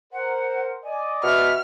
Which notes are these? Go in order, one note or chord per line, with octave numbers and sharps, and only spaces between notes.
A#4 C5 F#5
D5 D#5 G#5
B2 E5 F6